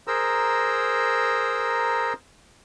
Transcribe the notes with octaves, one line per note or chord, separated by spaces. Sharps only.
G#4 A#4 C5 A#5 E6